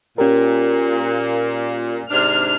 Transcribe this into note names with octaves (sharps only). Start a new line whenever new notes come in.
A#2 C#4 G4 A#4
G#2 C3 D4 F6